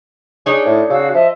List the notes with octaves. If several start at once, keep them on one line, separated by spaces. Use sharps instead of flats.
D4 D#4 G#4 C#5
A2
C#3 F#4 F5 E6
F3 D#5 E5